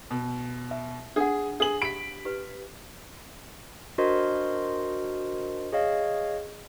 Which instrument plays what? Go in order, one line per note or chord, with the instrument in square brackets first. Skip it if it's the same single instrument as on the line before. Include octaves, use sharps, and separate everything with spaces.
[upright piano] B2
[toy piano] E5
[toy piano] D4 F#5 [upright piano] G#4
[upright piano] G#4 F#7
[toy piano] G4 B5 [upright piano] B6 D7
[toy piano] G4 B4
[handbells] D4 F#4 A#4 C5 D#5 C6
G#4 C#5 D#5 F5